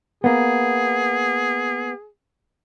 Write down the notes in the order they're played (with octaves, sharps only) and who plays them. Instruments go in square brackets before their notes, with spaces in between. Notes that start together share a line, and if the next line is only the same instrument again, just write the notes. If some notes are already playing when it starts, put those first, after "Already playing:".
[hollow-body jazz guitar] A#3 B3 [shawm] G#4